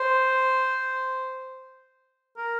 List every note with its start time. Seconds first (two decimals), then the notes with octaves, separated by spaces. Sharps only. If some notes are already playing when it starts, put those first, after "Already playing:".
Already playing: C5
2.37 A#4